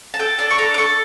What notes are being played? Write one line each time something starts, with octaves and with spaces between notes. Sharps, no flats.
A5
A4 G5
D4 A5
C#6
A4 A#5
D6
A4 C#6